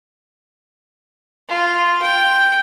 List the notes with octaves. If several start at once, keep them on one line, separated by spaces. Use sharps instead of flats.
F4
G5